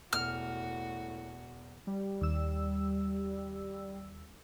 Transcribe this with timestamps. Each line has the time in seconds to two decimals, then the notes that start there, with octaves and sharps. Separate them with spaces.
0.13 E1 A2 F#4 F6
1.87 G3
2.21 D#2 E6